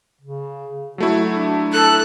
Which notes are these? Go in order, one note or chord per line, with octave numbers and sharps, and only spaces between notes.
C#3
F#3 A3 E4 F#4
D4
A4 F#6